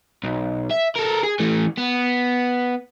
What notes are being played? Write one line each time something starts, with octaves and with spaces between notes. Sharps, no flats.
B1
E5
A4 A#4
G#4
E3 A3
B3